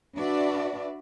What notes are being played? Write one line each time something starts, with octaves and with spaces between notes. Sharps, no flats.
D4 F#4 B4 D5 E5